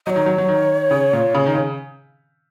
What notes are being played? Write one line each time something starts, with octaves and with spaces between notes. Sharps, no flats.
F#3 C#5 D#5
D#3
F#3
F#3
D#3
C#3
A#2
C#3
D#3
C#3